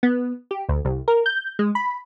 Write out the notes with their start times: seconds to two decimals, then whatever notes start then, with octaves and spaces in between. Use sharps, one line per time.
0.03 B3
0.51 G4
0.69 D2
0.85 C2
1.08 A#4
1.26 G6
1.59 G#3
1.75 B5